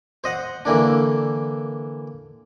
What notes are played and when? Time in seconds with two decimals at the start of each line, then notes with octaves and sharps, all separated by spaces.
0.24 C5 D#5 F#5
0.65 D3 E3 A#3 D4